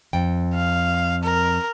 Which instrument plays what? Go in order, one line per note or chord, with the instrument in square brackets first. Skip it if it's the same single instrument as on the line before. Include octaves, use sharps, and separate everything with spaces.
[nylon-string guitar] F2 G5
[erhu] F5
A#4